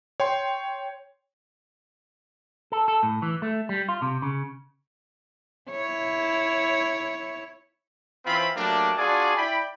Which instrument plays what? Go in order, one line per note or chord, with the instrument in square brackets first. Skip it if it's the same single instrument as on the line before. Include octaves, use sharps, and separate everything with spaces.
[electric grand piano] C#5 G5 C6
[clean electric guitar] A4
A4
A2
E3
A3
G3
F4
C3
C#3
[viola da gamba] E4 C#5
[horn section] E3 C4 C#4 F4 E5 B5
F#3 G3 A3 A#3 D4
D4 F4 F#4 G#4 D5 G#5
E4 D5 G5 B5